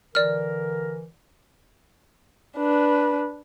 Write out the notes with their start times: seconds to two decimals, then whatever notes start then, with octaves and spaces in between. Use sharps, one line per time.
0.15 D3 E3 A#4 D5 F6
2.57 D4 B4